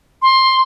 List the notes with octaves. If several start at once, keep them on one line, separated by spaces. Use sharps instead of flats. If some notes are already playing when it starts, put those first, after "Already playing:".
C6